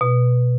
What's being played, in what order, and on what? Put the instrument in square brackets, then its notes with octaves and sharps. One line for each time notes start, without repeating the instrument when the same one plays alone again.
[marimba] B2